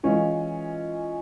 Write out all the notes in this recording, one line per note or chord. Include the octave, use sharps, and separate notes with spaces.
E3 G#3 C#4 F4